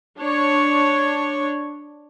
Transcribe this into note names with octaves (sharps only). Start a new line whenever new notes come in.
D4 C#5